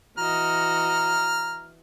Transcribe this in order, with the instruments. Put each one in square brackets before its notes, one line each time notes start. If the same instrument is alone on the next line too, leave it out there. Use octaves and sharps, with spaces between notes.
[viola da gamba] E3 F#4 D#5 [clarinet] A#5 [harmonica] F6